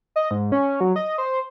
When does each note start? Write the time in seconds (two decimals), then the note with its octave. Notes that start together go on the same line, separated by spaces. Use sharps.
0.16 D#5
0.31 G#2
0.52 C#4
0.81 F#3
0.96 D#5
1.18 C5